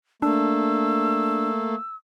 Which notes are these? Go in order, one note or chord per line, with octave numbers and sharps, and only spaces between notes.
A3 A#3 D4 E6